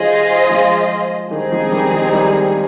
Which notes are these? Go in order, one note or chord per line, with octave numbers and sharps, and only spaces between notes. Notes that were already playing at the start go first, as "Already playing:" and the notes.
Already playing: D#3 G3 F4 G#4 C5 D#5
F3 G#3
D#3 G3 C4 D#4 G#4
F3 G#3
D#3 G3
D#3 G3
D#3 G3